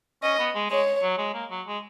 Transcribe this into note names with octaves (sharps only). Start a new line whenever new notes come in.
C#4 D#5
B3
G#3
G#3 C#5
F#3
G#3
A#3
F#3
G#3